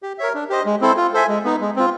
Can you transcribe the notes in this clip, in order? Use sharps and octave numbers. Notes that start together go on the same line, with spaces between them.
G4
A#4 C#5 E5
D4
G4 C5 D#5
G#3
C4 E4 A4 C5
F4
A4 C5 E5 G#5
G#3
B3 D#4
G#3
C4 F4